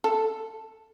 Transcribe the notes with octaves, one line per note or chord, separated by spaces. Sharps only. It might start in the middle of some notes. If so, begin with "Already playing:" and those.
A4